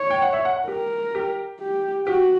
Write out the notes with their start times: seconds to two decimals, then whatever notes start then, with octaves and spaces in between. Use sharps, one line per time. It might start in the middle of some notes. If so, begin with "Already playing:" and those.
Already playing: C#5
0.10 G5
0.22 F#5
0.33 E5
0.45 F#5
0.56 F#5
0.67 G4 A#4
1.15 G4
1.60 G4
2.07 F#4 G4